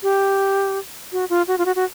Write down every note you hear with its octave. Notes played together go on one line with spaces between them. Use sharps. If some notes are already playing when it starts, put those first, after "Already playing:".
G4
F#4
F4
F#4
F4
F#4
F#4